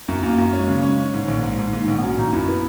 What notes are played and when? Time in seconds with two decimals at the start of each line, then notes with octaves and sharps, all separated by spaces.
0.08 F#2
0.23 F#2 A#3
0.38 F#2
0.53 G#3 C#4
0.68 C#3
0.74 A#3
0.83 G#3 C#4
0.98 C#4
1.14 G#2
1.28 A#1
1.43 G#2
1.59 G#2
1.73 G#2 A#3
1.87 A#1 B3
1.98 B3
2.03 F#3 C#4
2.18 A#1 D#4
2.33 F#2 E4
2.48 B3